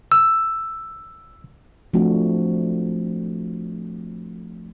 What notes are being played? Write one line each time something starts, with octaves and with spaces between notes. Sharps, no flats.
E6
F3 A3 C4 D4 F#4